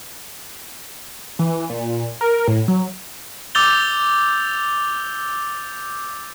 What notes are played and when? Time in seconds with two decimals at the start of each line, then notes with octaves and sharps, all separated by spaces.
1.39 E3
1.70 A#2
2.21 A#4
2.48 A2
2.68 F#3
3.55 D6 E6 G6 A6 F7 G7